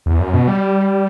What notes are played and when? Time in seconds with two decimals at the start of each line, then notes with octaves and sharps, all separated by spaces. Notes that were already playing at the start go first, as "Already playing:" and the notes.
0.06 E2
0.20 F#2
0.34 B2
0.48 G3